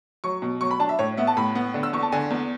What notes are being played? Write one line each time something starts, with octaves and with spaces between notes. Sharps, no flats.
F#3 C#6
B2
F#3 C#6
B5
D4 A5
E5
A2 C#5
B3 E5
A5
A2 B5
B3
D3
E6
E2 C#6
A5
D3 G#5
E2